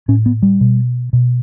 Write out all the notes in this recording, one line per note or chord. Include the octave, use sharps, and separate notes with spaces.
A2 C#4
B3
G3
B2
B2